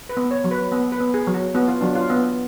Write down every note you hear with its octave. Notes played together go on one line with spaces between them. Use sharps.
B4
B3
C#5
F#3
B4
B3
B4
B3
G#4
F#3
F#4
B3 F#4
F4
F#3 D4
F4
B3